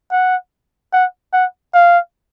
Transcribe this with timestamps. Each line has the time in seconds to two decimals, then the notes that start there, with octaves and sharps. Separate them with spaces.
0.11 F#5
0.93 F#5
1.33 F#5
1.74 F5